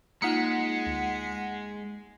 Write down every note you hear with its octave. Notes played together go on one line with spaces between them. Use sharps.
G#3 A#3 D#4 F4 F#5 B6 C#7
D2